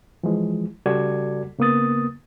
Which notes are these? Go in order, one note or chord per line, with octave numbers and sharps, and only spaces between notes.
E3 F3 G#3
C#3 G3 F#4 A4 D5 G#6
C#3 A#3 B3 D#6 A6